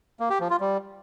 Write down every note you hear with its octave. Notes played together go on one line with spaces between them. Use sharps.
A#3
G4
F3
F4
G3